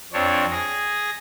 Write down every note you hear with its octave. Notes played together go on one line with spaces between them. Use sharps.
F2 C4 D4 C#5
G#4 A#6